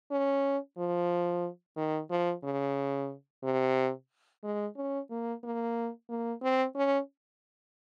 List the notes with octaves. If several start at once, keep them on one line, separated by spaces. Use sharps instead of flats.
C#4
F3
D#3
F3
C#3
C3
G#3
C#4
A#3
A#3
A#3
C4
C#4